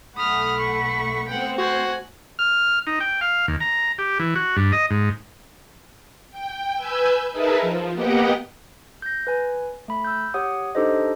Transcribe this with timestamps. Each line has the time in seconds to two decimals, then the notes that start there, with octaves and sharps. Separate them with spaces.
0.17 B1 A3 F#5 B5 D#6 F6
0.60 C#6
1.28 A3 B3 C4 F#5 G5
1.58 F#4 C5 G#5 F#6
2.39 F6
2.87 D#4
3.00 G5
3.21 F5
3.48 D#2
3.60 A#5
3.98 G4
4.20 E3
4.36 F#4
4.57 G2
4.72 D#5
4.90 G#2
6.31 G5
6.75 B4 G#5 E6 G6
7.32 D#4 G#4 A#4 B4 E5 A5
7.61 F3
7.93 A#3 B3 G4 D#5 F#5 G5
9.02 G6 A#6
9.27 B4 G#5
9.88 A3 B5
10.04 E6 G6
10.34 G4 C#5 F#5 D#6
10.75 D4 D#4 G4 A4 C5 D#5